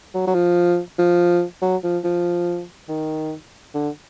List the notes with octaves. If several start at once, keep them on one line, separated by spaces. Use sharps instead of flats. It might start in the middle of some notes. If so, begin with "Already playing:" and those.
F#3
F#3
F3
F3
F#3
F3
F3
D#3
D3